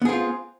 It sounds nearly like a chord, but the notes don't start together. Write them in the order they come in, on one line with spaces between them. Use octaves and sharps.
B3 G#4 C4 F4